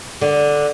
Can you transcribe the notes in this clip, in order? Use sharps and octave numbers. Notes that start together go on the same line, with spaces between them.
D3